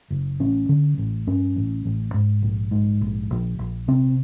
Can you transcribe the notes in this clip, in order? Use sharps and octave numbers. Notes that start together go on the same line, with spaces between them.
F#1
A1 C#4
D3
A1
G2 C#4
A1
A1
G#2
A#1
G#2
A#1
A#1
A#1
C3 C4